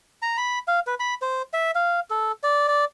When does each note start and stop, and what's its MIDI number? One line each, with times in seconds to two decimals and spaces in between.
0.22 0.37 82
0.37 0.59 83
0.68 0.80 77
0.87 0.95 71
1.00 1.14 83
1.22 1.42 72
1.53 1.71 76
1.75 2.00 77
2.10 2.32 69
2.44 2.68 74
2.68 2.85 74